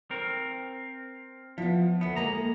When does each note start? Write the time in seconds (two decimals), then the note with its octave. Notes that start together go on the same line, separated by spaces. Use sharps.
0.11 C4 A#4
1.58 F3 B3 E4
2.01 D2 B3 E5
2.16 G#3 A#3 A4 A#5